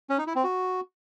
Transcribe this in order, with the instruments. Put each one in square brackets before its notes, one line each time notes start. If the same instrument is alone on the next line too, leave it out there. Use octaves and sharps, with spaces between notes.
[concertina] C#4
D#4
E4
C4
F#4